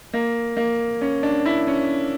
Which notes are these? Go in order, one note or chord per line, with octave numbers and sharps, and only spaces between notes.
A#3
A#3
C#4
D4
E4
C#4